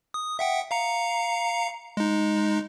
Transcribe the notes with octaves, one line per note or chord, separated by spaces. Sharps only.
D#6
E5 F#5 G5
F5 A#5 C#7
G#3 D#4